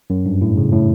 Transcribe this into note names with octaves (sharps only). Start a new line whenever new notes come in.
F#2
G2
A2
C#3
A2